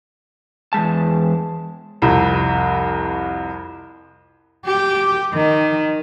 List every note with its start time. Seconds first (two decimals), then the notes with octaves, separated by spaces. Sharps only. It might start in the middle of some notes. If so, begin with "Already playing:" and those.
0.73 E2 G2 G#3 A5
2.02 C2 F2
4.66 G4
5.33 D#3